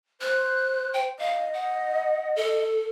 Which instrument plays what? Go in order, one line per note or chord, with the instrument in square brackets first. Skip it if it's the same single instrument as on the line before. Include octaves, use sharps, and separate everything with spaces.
[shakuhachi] C5 [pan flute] F#6
[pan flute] G5
[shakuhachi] D#5 [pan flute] F5
[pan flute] F#5
A4